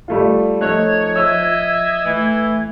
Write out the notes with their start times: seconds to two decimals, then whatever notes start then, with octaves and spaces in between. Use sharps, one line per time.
0.08 G3 A3 F4
0.61 F3 A3 D#4 C#5 F#6 G#6
1.16 D#5 E5 E6
2.05 E3 A3